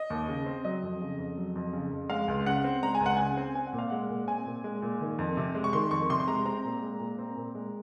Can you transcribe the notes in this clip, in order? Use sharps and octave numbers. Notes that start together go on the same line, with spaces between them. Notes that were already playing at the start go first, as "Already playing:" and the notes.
Already playing: D#5
D#2
C#3
C4
F#3 D#5
F2
C#3
F2
F#3
F2
C#3
F2
G#3 F5
C#2
C#3 F#5
C4
G#3 A#5
G#5
C#2
F#5
C#3 G#5
C4
C4 G#5
F#5
A#2
F5
G#3 F#5
A#2
C4 G#5
A#2
G#3
A#2
D#3
F2
C3
G#3
C#6
D#3 C6
F2 C#6
C3 C6
C6
G#3 A#5
C4 A#5
A#2
G#3
A#2
C4
A#2
G#3